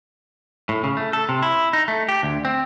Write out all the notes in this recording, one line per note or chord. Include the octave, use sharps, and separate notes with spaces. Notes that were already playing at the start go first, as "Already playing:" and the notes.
A2
C#3
A3
A4
C3
E4
D#4
A3
G4
D2
C4